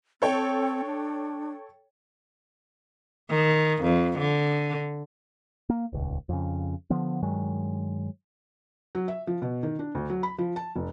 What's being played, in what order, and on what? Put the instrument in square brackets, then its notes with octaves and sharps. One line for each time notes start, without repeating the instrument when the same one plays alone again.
[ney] C4 [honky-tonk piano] A4 C#5 G5
[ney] D4
[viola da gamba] D#3
F2
D3
[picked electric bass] A#3
D#1 C#2
F2 C#3
D3 F3 B3
G2 D#3 F#3 G#3
[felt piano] F#3
E5
F3
B2
D#3
D4
D2
F#3
B5
F3
A5
F1